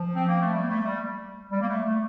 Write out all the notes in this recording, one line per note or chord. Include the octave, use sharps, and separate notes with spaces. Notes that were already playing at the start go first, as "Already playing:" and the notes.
Already playing: F3
C4
A#3
A3
G3
A#3
A3
G3
G3
A#3
A3
A3